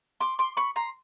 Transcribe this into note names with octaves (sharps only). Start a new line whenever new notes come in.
C6 D6
C6 D6
B5 C#6
A#5 C6